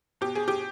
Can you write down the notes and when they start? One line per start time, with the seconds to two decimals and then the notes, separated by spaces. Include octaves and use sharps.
0.21 B2 G4
0.35 G#4
0.48 G4